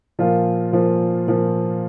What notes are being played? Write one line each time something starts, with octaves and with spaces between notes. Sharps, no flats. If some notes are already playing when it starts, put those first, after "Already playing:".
A#2 F3 F4
A#2 F3
A#2 F3